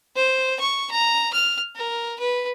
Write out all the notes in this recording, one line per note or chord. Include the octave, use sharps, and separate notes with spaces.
C5
C#6
A#5
F6
A#4
B4